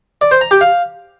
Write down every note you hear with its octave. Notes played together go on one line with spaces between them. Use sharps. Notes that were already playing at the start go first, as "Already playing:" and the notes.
D5
C5
A#5
G4
F5